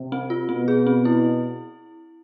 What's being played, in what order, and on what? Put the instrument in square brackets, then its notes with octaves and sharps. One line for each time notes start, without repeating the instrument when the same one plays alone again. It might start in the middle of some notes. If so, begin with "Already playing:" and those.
Already playing: [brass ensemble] C3
[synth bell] C4
F4
[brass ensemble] B2 [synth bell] C4
[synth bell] G#4
C4
E4